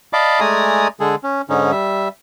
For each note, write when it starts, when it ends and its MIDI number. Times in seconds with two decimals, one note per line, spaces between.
0.13 0.40 74
0.13 0.40 75
0.13 0.40 77
0.13 0.40 81
0.13 0.40 83
0.13 0.40 86
0.40 0.88 56
0.40 0.88 57
0.40 0.88 74
0.40 0.88 80
0.40 0.88 82
0.40 0.88 87
1.00 1.15 50
1.00 1.15 56
1.00 1.15 68
1.00 1.15 69
1.23 1.42 61
1.49 1.72 44
1.49 1.72 50
1.49 1.72 61
1.49 1.72 63
1.72 2.08 55
1.72 2.08 76